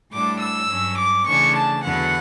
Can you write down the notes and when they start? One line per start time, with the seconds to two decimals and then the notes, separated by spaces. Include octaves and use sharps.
0.11 A2 G3 D4 D6
0.40 E6
0.69 G2 F#3 C#4
0.98 D6
1.26 C#3 E3 A3 D4 C#6
1.54 A5
1.83 E2 D3 F#3 B3 F#5